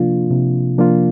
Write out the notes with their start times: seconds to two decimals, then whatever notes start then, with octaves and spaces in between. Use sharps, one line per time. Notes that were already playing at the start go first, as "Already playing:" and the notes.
Already playing: C3 F3 A#3 D4 F4
0.30 C3
0.78 F3 A#3 D4 F4